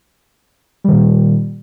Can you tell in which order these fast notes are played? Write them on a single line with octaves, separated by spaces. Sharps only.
G3 D#3 A#2